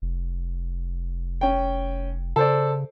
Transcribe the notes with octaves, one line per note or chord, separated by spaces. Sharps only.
F1
C#4 G5
C#3 A4 C5 D5